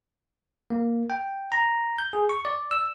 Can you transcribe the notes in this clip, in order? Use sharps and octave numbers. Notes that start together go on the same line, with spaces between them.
A#3
G5
A#5
G6
G#4
C#6
D5
E6